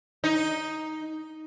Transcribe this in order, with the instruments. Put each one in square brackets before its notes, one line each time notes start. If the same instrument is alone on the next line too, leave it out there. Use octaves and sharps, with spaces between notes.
[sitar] D#4